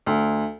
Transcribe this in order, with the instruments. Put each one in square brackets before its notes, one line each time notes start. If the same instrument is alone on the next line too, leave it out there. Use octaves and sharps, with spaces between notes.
[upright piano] D2